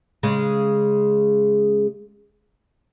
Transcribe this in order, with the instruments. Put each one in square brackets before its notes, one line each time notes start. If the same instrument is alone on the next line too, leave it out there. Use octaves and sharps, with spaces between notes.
[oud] C#3 G#3